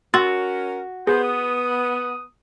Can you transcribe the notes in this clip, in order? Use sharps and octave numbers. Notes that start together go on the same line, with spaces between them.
C#4 F#4 A#4 C6 E6 A6
B3 G#4 C5
D#6